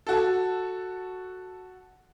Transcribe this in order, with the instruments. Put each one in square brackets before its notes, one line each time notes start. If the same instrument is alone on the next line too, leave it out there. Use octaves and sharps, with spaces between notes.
[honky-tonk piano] F#4 A4